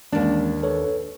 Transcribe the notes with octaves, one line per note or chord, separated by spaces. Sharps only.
D#2 E3 G#3 C#4 D4
A4 B4 C#5